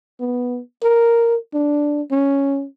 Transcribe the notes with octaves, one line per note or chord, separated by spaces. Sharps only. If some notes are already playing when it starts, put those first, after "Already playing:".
B3
A#4
D4
C#4